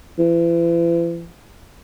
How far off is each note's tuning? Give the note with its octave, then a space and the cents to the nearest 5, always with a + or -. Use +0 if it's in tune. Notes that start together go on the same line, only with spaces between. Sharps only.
E3 +40